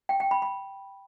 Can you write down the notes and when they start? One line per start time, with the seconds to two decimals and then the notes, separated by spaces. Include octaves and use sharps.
0.09 G5
0.20 G5
0.31 B5
0.42 B5